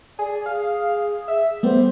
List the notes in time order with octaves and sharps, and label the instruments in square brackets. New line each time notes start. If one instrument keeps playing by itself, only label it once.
[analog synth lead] G#4 [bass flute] D5
[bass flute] G#4 [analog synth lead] F5
[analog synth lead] E5
[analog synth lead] G3 [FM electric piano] A3 B3 [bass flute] C5